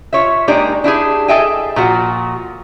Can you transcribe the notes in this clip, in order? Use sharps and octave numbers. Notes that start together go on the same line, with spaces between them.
F4 C#5 E5
G#3 A#3 D4 D#4 G4 D5
D4 E4 G4 G#4
G#4 A4 D#5 E5 G5 G#5
A#2 F3 F#4